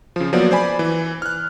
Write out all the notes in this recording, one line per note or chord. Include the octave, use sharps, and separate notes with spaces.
C#3 F3
F3 F#3 A#3 B3 D5
C5 D5 G#5 B5
E3
F6 F#6